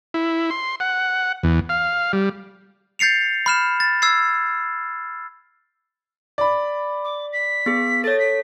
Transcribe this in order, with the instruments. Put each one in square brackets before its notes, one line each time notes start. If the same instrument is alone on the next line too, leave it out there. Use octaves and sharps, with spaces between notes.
[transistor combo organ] E4
C6
F#5
E2
F5
G3
[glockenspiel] G6 A6 C7 C#7 F7
B5 F6 E7
A6
E6 G#6 C7
[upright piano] D5 B5
[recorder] D6
B6
[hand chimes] B3 G#4
[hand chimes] A4 C#5 [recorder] A6
[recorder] B6